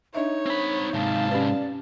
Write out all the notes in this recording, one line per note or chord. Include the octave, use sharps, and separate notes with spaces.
D4 D#4 C#5 D#5 E5
C4 B5
G#2 C3 F5 A5
C#4 G4 B4 D5